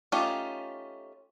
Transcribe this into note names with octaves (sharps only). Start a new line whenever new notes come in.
A3 C#4 D#4 F4 G4